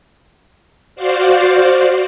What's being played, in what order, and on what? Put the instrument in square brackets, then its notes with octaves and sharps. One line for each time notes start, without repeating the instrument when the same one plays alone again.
[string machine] F#4 C5 D5 F5